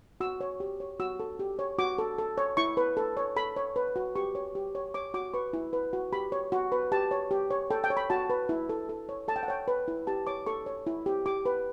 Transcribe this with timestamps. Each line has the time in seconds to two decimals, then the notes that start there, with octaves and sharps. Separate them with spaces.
0.21 F#4 E6
0.41 C#5
0.60 G4
0.80 C#5
1.00 F#4 E6
1.20 A4
1.39 G4
1.59 C#5
1.78 F#4 D6
1.98 A4
2.18 A4
2.38 C#5
2.57 E4 C#6
2.77 B4
2.97 A4
3.17 C#5
3.36 A4 B5
3.56 C#5
3.76 B4
3.96 F#4
4.16 G4 C#6
4.35 C#5
4.55 G4
4.75 C#5
4.94 C#5 D6
5.14 F#4 D6
5.34 B4 C#6
5.53 E4
5.73 B4
5.93 F#4
6.13 G4 B5
6.32 C#5
6.52 F#4
6.72 B4
6.92 G4 A5
7.11 C#5
7.31 G4
7.51 C#5
7.71 A4 G5
7.84 G5
7.90 C#5
7.97 B5
8.10 F#4 A5
8.30 B4
8.49 E4
8.69 A4
8.89 A4
9.09 C#5
9.28 A4 A5
9.36 G5
9.43 F#5
9.48 C#5 G5
9.68 B4
9.88 E4
10.07 G4 A5
10.27 C#5 D6
10.46 A4 C#6
10.66 C#5
10.87 E4
11.06 G4
11.26 G4 D6
11.46 B4